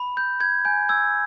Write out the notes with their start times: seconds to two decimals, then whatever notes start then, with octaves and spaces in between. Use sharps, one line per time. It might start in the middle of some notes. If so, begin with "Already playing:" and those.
Already playing: B5
0.17 G6
0.40 G6 G#6
0.65 G#5 G6
0.89 E6 G#6